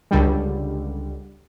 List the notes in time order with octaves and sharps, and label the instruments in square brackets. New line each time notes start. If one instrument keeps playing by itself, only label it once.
[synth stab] C#2 D3 G3